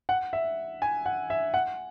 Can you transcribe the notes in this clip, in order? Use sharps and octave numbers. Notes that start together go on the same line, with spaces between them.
F#5
E5
G#5
F#5
E5
F#5